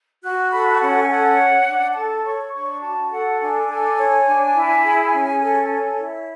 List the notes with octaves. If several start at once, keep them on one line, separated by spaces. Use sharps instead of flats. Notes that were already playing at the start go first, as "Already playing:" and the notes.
F#4 F#6
A4 B5
C#4 F#5
G#5
A4 F#5
C#5
D4
A4 A5
C#5 C#6
D4 C#6
F#4 A5
A4 F#5
D4 G#5
A4 G#5
C#5
D4
E4
G#4
C#4
A4
C#5
E4